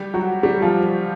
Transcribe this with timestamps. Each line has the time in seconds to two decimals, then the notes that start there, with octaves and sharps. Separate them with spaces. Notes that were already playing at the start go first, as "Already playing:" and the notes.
Already playing: G3 G4
0.14 F#3 F#4
0.43 G3 G4
0.62 F3 F4